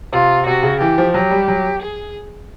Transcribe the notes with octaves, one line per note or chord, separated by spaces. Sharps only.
C3 F4
C3 F#4
C#3
E3 G4
F3
F#3 G4
G3
F#3
G#4